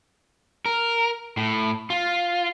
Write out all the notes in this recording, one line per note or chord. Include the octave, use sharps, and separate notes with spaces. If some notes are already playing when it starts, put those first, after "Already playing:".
A#4
A2
F4